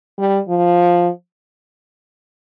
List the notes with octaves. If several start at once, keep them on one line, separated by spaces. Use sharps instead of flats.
G3
F3